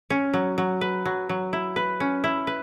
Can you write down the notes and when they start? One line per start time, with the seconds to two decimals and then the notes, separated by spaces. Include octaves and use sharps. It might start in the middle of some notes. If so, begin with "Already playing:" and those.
0.10 C#4
0.33 F#3
0.58 F#3
0.81 B4
1.05 F#3
1.29 F#3
1.53 E4
1.76 B4
2.00 C#4
2.24 E4
2.47 B4